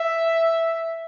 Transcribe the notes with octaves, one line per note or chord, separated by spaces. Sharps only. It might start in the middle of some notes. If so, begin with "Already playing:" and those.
Already playing: E5